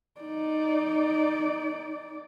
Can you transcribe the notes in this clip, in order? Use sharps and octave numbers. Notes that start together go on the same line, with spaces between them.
D#4 D5